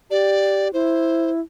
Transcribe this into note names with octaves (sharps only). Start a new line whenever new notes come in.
G4 D5
E4 C5